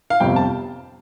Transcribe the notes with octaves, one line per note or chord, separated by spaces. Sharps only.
F5
G1 F2 C3 G5
A5